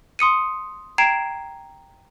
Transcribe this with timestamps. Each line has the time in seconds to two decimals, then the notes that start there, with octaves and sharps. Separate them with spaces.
0.19 C6 D#6 C#7 D#7
0.98 G5 A#5 G#6 C7 D7 E7